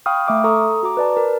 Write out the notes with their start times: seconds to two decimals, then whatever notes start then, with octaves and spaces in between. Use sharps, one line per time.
0.06 F5 G5 B5 C#6 D#6 F6
0.27 A3 E5 D6 F6
0.44 A4 A#5 C#6 D#6
0.83 F#4 A#5 D6
0.97 B4 D5 A5
1.17 A#4